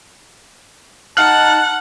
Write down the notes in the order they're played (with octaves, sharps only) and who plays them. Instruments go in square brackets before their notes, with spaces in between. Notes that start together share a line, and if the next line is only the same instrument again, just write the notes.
[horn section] D#4 A5 [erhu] F#5 [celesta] F6 [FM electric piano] F#6